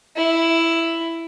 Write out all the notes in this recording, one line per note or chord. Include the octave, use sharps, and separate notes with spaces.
E4